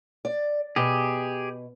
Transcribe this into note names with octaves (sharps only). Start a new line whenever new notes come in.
D5
B2 G4 G#4